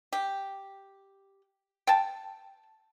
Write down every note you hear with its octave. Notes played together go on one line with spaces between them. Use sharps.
G4
G5 A5